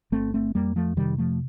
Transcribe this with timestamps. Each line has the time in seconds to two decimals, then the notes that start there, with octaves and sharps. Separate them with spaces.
0.12 G1 A3 C4
0.34 A3 C4
0.55 F2 G3 A#3
0.76 F3 A3
0.97 C3 D#3 G3
1.18 F3 A3